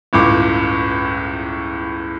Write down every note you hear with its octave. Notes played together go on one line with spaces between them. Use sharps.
G1 C#2 A2 D6